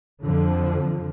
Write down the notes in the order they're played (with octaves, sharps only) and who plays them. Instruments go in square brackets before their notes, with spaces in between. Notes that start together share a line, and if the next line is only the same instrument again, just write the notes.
[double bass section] F2 D3 F3